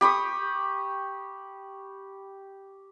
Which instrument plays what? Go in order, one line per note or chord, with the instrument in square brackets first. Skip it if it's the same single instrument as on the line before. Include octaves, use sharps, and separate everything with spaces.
[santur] G4 B5 C#6 D#6